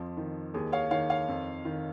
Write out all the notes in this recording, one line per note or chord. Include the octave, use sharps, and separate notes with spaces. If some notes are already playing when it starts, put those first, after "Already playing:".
Already playing: F2 F3
D#3
D#2 G#4
C#5 F5
D#3 C#5 F5
C#5 F5
F2
D#3